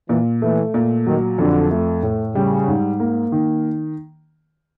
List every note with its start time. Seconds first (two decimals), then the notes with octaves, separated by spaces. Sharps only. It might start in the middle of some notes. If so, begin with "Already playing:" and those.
0.09 A#2 E3
0.42 E3 A3
0.74 A#2
1.07 D#3 F#3
1.38 F2 D3
1.71 A3
2.03 A2
2.35 C#3 G3
2.67 G#2
3.00 A#3
3.32 D#3